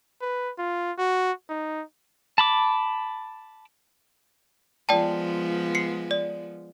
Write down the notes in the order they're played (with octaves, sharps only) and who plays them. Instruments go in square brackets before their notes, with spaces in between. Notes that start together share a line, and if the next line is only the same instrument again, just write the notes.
[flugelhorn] B4
F4
F#4
D#4
[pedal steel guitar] A5 B5 D6
[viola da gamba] F3 G#3 B3 [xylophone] D5 G5 A5
[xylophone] C7 C#7
D5